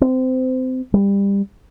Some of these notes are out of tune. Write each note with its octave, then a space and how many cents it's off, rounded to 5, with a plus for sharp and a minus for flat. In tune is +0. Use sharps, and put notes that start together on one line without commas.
C4 -25
G3 +25